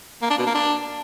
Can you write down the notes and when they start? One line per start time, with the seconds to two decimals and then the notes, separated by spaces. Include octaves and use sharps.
0.22 A#3
0.30 D4
0.38 B2
0.46 A#3
0.54 D4